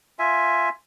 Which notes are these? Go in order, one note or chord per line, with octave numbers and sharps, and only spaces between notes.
F4 E5 G#5